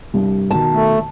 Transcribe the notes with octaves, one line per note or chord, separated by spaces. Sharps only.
C2 G2
B2 D#3 A5
A3